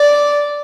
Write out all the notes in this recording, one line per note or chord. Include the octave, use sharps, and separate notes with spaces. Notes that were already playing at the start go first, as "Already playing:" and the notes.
Already playing: D5